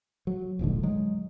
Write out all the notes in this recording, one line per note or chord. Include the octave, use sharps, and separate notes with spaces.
F#3
D#1 A#1 G#2 D3
F#3 G#3